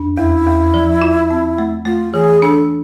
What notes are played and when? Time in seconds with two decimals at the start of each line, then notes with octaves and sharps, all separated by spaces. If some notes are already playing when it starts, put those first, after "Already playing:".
Already playing: F2 D4
0.17 E2 E4
0.46 E2
0.74 F3
1.02 F4
1.30 C4
1.58 A3
1.85 A3 F4
2.13 E3 G#4
2.42 D4 A4